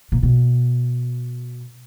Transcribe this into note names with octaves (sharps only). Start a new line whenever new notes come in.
A#2
B2